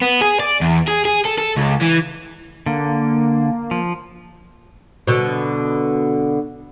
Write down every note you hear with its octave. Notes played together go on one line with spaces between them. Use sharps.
B3
G#4
D5
E2
G#4
G#4
A4
A4
C#2
E3
D3 A#3
F3
B2 D3